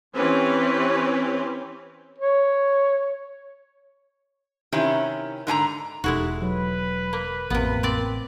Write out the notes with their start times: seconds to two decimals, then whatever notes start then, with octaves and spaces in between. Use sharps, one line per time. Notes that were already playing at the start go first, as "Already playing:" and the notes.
0.14 E3 C4 C#4 G4 B4 C#5
2.18 C#5
4.72 C3 D#3 C#4 E4 G4
5.47 G#2 D3 G#5 A#5
6.04 E1 G#3 D#4 E4 F#4 G4 A4
6.42 F#3 B4
7.13 A#3
7.50 A1 F2 C3 A#3 B3 A#4
7.83 C4 D5